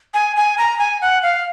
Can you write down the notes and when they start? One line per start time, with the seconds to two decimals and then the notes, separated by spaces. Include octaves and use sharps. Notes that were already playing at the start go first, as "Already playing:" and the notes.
0.14 G#5
0.36 G#5
0.58 A#5
0.79 G#5
1.02 F#5
1.23 F5